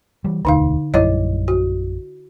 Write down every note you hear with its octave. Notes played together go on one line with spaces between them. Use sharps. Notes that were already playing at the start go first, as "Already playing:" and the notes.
E3 G3
E1 D2 D3 D#4 F5
A#1 F#2 G3 E4 C#5 D#5
F#4